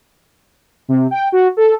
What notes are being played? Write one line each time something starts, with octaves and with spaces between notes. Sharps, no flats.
C3
G5
F#4
A4